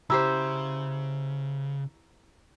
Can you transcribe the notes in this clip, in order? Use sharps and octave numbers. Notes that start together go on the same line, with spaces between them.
C#3 E4 G4 C5 A#5 E6